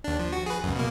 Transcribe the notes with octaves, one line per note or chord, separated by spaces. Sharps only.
D#2 D4
F3
F#4
G#4 B4
C#2 F#2
B2 A#3